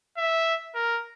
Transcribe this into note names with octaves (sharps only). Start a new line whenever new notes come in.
E5
A#4